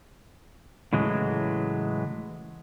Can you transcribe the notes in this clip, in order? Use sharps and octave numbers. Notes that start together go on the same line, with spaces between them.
A2 C#3 E3 F#3 G#3 A3